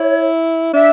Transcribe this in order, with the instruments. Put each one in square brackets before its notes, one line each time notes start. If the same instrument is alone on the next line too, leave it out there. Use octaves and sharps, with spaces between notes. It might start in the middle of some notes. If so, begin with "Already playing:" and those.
Already playing: [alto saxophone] E4 [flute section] C#5
[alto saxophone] D4 [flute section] E5